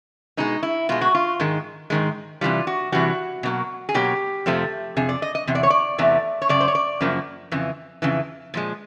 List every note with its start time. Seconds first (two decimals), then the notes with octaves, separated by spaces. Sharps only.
0.37 B2 G#3 D#4
0.63 E4
0.89 B2 G#3 F4
1.01 F#4
1.15 F4
1.40 G#2 D#3 G#3
1.90 G#2 D#3 G#3
2.41 C3 E3 G3 F4
2.67 F#4
2.92 C3 E3 G3 F#4
3.43 B2 F#3 A#3
3.89 G#4
3.94 B2 F#3 A#3 G4
4.46 F2 C3 F3 A3
4.97 F2 C3 G#4
5.09 D5
5.22 D#5
5.35 D#5
5.47 E2 C3
5.55 D5
5.63 C#5
5.70 D5
5.98 E2 C3 E3 A3
6.42 C#5
6.49 F#2 C#3 D5
6.61 C5
6.68 C#5
6.75 D5
7.01 F#2 C#3 F3 A#3
7.51 F2 C#3 E3
8.02 F2 C#3 E3
8.54 A#2 F3 G#3